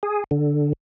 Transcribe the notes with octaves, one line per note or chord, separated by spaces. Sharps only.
G#4
D3